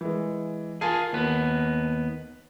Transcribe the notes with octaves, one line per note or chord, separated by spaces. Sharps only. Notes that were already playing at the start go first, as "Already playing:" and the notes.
E3 G#3
F4 G#4 A#4 G#5 A5
D#2 B3